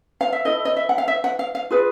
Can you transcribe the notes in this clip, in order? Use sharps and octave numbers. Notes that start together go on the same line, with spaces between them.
F5
E5
E4 A4 D#5
D#5
E5
F#5
F5
E5
F#5
F5
F5
F4 G#4 B4